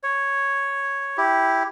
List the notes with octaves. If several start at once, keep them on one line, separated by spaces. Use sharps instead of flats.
C#5
E4 G4